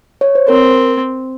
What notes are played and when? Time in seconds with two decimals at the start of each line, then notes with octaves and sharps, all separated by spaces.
0.21 C#5
0.35 C5
0.48 C4 A#4